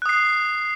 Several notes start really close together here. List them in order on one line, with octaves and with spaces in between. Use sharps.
F#6 D#6 C7